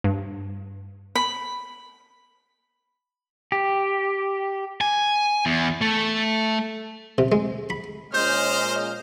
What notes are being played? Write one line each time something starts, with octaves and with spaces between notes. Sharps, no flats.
G2
B5
G4
G#5
E2
A3
C3
G#3
B5
A#2 G#3 C#4 C5 D#5 F6 G6